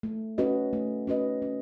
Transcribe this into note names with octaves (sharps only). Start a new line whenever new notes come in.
A3
C#4 F#4 B4 D#5
A3
C#4 F#4 B4 D#5
C#4